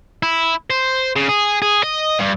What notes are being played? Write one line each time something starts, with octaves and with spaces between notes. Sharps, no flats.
E4
C5
C#3
G#4
G#4
D#5
G2